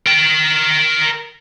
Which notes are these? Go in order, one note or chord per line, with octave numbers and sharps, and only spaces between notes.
A#4 G5